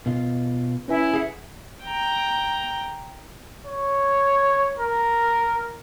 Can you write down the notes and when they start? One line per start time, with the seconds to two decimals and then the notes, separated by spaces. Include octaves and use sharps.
0.06 B2 F4
0.88 C#4 E4 B4 G#5
1.14 G#4 F5 F#5
1.84 G5 A#5
3.66 C#5
4.79 A#4